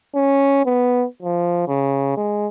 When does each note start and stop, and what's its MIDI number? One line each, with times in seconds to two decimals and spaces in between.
0.15 0.64 61
0.66 1.05 59
1.23 1.66 53
1.68 2.16 49
2.17 2.47 56